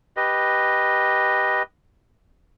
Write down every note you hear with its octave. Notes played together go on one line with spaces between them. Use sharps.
G4 B4 D#5